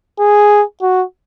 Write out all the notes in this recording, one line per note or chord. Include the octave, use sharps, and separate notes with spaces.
G#4
F#4